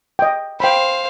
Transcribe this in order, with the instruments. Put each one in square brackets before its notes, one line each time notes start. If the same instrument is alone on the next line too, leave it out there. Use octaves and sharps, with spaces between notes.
[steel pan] D#5 G5
[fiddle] C5 F5 [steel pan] G5 B5